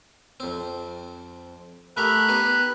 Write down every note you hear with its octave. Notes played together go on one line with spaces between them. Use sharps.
F2 C4
A3 G4 A#4 B5 F#6
B3 D#4 G4